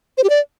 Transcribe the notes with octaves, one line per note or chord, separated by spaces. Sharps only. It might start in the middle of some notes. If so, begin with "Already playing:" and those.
C5
G4
D5